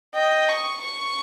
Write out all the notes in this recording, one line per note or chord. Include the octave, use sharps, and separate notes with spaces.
D#5 G5
C#6
C#6